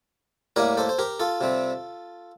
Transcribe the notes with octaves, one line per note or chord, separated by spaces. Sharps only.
A2 G3 A#3 A#4 D5
A4 C5
C5
G4 A#4
F4 A4
C3 G3 C4